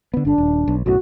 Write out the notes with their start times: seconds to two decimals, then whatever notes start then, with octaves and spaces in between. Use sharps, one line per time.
0.14 D3 B3
0.25 G1 D3 D4
0.38 D#1
0.68 B1
0.86 B1 F#2 A2 F#4